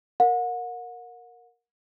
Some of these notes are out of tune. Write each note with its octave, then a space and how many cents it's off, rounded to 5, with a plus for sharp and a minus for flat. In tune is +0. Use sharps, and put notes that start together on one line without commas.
A#4 +0 F#5 -35